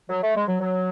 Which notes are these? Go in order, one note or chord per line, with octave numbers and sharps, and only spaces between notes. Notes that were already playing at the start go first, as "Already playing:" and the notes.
F#3
A3
G#3
F#3
F#3